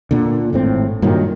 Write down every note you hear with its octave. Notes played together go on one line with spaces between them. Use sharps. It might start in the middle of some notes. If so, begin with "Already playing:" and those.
A#2 D3
G#1 A2 C4
G2 A#2 D#3 F#3